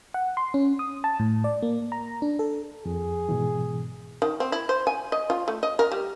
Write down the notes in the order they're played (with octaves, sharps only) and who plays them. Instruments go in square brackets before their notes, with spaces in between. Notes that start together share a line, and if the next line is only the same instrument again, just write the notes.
[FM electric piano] F#5
C6
C#4
D#6
A5
A2
D5
A#3
A#5
D4
A4
[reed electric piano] F2 [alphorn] G#4
[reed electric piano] G#2 B2 E3
[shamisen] D#3
C4
E4
C5
G#5
D#5
F4
A3
D#5
A#4
G3